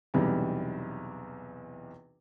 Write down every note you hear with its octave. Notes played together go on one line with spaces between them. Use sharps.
B1 E2 C3 G3